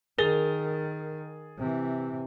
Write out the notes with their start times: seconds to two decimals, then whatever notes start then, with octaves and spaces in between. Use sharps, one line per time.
0.18 D#3 G#4 A#4 A6 G7
1.57 C3 E3